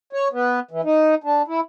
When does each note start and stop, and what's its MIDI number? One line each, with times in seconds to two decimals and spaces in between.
0.13 0.28 73
0.32 0.60 59
0.71 0.81 52
0.84 1.15 63
1.24 1.42 62
1.48 1.60 64